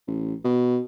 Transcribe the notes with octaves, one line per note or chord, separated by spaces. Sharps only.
A1
B2